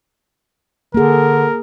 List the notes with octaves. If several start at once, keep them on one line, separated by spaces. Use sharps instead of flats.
D3 A#3 G#4 A#4